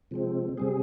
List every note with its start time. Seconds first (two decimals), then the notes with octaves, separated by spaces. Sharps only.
0.11 C3 F3 G#3 C4
0.57 C3 G3 C4 G#4